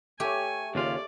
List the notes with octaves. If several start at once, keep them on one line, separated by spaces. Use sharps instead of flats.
A3 G4 C#5 G#5
D#2 C#3 F4 D5